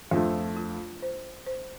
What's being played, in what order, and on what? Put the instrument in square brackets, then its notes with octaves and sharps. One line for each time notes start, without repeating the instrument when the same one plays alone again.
[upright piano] F2 F3 A3 [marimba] D4
[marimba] F4
C5
C5